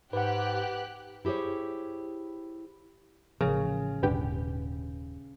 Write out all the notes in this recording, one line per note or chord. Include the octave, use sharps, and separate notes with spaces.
G#2 G4 B4 F#5 F#6
E4 G4 G#4 C5 C#5
A1 C#3 F3 A#4
D#1 G#2 D3 G4 B4